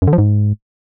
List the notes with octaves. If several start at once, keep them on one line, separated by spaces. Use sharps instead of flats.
F#2
D3
F3
G#2